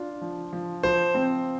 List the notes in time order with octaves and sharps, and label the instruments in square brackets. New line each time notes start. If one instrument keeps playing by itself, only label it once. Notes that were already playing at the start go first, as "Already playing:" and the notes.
Already playing: [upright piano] D4 F4
F3
F3
[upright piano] F3 [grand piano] C5
[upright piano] C4